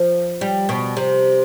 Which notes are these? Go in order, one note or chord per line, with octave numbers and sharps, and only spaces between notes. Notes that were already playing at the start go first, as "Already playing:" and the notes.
Already playing: F3
G3
B2
C3